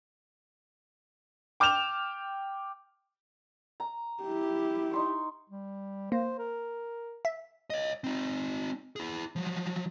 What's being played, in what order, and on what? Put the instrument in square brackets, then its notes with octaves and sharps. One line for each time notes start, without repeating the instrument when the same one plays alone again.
[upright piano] G5 D6 F6 G6 E7 F7
[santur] A#5
[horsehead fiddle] E4 G4
[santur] D#4 C6 C#6
[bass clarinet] G3
[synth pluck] A#3 [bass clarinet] C5
[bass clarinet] A#4
[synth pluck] E5
[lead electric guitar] C#5 D#5
C4 D#4
E4 G#4
F3 F#3